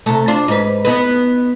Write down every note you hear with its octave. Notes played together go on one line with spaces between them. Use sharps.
C3 A3
D4 F4 C5
G#2 B4
B3 D#4 B4